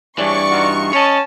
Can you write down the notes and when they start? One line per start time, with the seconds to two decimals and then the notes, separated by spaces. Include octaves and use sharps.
0.18 G2 E3 D4 G#4 C#5 D5 C#6
0.49 D#4 F4 F#4
0.93 C#4 C#5 D#5 A5